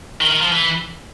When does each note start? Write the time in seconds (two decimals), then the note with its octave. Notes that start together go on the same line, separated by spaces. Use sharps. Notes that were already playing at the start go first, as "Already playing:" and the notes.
0.21 D#3
0.31 D#3
0.42 F3
0.52 E3